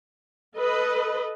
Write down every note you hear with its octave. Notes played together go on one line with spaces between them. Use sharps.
A4 B4 D#5